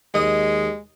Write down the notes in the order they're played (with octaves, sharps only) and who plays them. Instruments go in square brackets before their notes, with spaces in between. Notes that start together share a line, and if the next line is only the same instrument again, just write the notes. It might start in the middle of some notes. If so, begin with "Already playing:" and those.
[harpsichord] D#2 D#5 D#6 [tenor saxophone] G#3